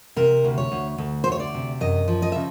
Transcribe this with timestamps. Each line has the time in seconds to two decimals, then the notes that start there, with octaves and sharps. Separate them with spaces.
0.16 C3 A#4
0.45 D2
0.58 C#5
0.72 D2
0.98 D2
1.24 D2 C5
1.32 C#5
1.40 D5
1.54 C3
1.81 F#2 D#5
2.08 F3
2.22 D#5
2.32 C#3 E5